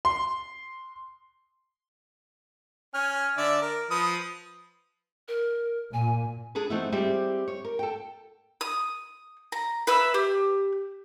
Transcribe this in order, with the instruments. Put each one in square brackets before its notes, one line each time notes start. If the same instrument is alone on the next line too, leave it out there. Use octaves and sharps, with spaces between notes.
[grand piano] C6
[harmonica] C#4 G#5 F6
D3 D5 E5
A#4
F3 B4 D#6
[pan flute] A#4
[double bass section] A#2 [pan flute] G#5
[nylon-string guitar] D4 G#4 A4 B4
E3 A3 B3 C4 D#4 E4
G3 C4 E4 G4 G#4 E5
C#5
A#4
A4 G5
[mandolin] D#6
A#5
B4 E5 E6
G4